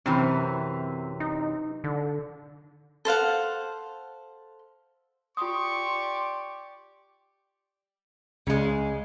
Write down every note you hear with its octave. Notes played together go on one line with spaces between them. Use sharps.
F#2 C3 E3 C4
D#4
D3
A4 C5 F5 F#5
F4 G4 D5 C6 C#6 D#6
C#2 C#3 G#3